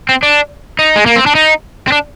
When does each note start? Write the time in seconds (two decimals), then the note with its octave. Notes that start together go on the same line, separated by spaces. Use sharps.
0.09 C4
0.23 D4
0.79 D#4
0.96 G#3
1.06 A#3
1.16 C4
1.26 D4
1.35 D#4
1.88 C4
1.92 D4